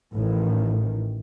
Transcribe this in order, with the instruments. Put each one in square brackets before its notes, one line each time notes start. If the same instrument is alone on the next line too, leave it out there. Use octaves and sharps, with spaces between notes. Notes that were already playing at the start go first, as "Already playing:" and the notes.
[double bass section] A1 A2 D#3